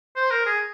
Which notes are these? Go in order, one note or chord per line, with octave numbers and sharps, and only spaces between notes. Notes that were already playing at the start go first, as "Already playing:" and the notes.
C5
A#4
G#4